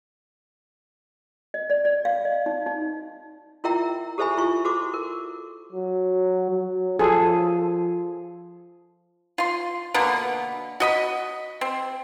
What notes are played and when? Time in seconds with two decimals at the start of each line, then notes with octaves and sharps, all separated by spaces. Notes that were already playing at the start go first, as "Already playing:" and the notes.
1.54 D#5
1.70 D5
1.85 D5
2.05 F5
2.25 D#5
2.46 D#4
2.66 D#4
3.64 E4 F4 A#4 E5 G5 A#5
4.18 G4 A4 C5 E5 G#5 B5
4.37 E4 F4 C#6
4.65 F#4 A4 C5 D6
4.94 A#4
5.72 F#3
6.51 F#3
6.99 F3 G#4 A4
9.38 F4 C6
9.94 B2 D3 A#3 B3
10.80 F#4 D#5 B5
11.61 C4